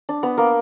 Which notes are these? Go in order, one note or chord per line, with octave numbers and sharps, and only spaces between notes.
D4
B3
A#3